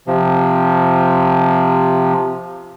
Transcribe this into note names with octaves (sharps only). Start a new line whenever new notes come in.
C3 F3